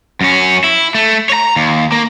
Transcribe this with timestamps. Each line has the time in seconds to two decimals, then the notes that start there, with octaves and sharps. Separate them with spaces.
0.21 F#2 C#4
0.64 E4
0.95 A3
1.30 C#5 A#5
1.56 D#2
1.92 A#3